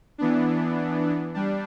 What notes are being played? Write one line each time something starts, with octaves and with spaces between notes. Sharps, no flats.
E3 B3 D4
G3 D4